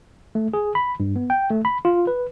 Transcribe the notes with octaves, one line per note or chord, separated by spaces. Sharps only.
A3
G#4
B5
G2
B3
G5
A3
B5
F4
B4